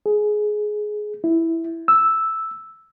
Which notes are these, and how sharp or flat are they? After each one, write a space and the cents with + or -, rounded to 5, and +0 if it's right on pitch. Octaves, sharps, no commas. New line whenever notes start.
G#4 +15
E4 -5
E6 -5